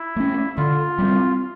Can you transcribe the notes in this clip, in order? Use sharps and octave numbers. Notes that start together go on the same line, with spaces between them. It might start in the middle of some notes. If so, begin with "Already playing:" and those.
Already playing: E4
A3 C#4
D3 F4
G3 C4